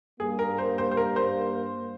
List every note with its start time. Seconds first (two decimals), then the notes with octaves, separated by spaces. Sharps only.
0.20 G2 G3 A#3 G#4
0.39 A#4
0.58 C5
0.78 C5
0.91 C5
0.97 A#4
1.16 C5